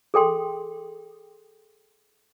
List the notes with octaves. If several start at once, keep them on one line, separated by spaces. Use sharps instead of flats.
G#4 A4 G5 C6